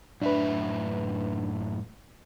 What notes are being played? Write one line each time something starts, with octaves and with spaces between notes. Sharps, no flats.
F#2 A2 D4 B4 E5